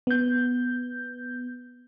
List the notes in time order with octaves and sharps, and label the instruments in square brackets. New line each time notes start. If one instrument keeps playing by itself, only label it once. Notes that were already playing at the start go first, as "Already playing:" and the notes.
[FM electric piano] B3 G6